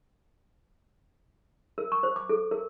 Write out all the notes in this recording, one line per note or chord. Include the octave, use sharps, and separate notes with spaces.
A#4
C#6
C5
D6
A4
A#4